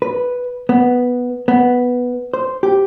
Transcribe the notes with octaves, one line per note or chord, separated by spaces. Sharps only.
B4
B3
B3
C5
G4